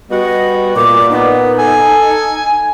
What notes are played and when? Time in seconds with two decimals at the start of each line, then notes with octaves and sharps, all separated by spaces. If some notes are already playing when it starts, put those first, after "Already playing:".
0.11 G3 B3 F#4 D#5
0.76 A#2 D6
1.10 B3 D#4
1.59 A4 G#5